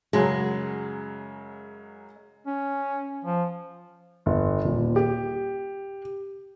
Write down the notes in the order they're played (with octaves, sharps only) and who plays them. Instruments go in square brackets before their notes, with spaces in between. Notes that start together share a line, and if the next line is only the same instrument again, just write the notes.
[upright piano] F#2 C#3 F#3 [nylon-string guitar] G#3
[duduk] C#4
F3
[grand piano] G1
D#1
G4